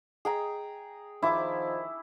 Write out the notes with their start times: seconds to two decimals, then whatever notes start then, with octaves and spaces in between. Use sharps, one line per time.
0.25 G#4 G5 A#5
1.22 D#3 F3 E4 D6